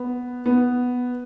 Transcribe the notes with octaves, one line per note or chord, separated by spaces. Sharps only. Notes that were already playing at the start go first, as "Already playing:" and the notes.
Already playing: B3
B3